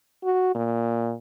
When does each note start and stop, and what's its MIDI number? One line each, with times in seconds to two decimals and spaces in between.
0.24 0.52 66
0.55 1.14 46